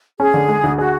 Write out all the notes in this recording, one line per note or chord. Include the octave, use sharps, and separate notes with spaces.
C#4 G#4
D3
G#3
D2
F#4 G#4